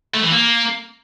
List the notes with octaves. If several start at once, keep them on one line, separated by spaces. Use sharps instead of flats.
A3
E3
A#3